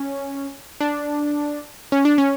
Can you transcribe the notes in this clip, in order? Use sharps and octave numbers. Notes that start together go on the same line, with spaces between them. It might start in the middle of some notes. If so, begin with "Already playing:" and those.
Already playing: C#4
D4
C#4
D4
C#4